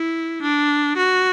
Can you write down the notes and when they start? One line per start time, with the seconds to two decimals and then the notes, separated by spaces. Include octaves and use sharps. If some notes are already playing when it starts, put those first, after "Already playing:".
Already playing: E4
0.42 D4
0.97 F#4